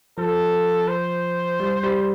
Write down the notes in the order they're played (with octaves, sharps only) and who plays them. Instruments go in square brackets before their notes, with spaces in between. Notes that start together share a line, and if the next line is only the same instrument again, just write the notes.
[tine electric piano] F3 [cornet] A4
[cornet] C5
[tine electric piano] G3
G3